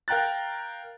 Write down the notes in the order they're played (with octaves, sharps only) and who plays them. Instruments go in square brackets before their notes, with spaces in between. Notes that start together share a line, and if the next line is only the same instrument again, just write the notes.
[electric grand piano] A#4 F5 G5 A#5 F#6 A6